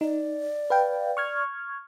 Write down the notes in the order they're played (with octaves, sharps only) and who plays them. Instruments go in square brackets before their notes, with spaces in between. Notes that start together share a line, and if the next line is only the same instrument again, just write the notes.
[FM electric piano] D#4 [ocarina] D5
[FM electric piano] B4 F5 G5
C#6 F6 G#6